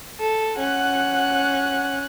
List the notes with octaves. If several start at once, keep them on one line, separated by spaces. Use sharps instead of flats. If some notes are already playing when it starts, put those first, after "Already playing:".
A4
C#4 F#5 F#6